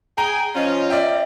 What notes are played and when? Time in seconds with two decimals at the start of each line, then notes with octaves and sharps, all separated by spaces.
0.18 G#4 G5 G#5 A#5
0.56 F3 C#4 F4 D#5
0.90 D5 E5 G5